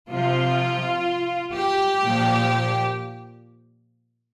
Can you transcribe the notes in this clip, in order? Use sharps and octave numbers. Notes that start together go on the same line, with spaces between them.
C3 F3 F4
G4
A#2 F3